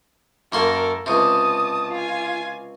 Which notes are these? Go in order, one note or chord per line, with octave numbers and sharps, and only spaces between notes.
F#2 A#3 A4 A#4 C6
C#2 C3 A5 D#6
F4 G#5